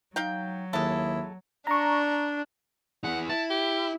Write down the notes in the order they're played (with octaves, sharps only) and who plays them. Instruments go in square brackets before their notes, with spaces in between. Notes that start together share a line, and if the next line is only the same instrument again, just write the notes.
[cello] F#3 [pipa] D#4 F5 G5
[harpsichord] D#2 [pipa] G#3 A4 [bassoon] E4
[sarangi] D4 [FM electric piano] A#5 C#6
[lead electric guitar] E3 G#4 [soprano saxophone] F#5
[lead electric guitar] E4 [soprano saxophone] A5
[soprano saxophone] G4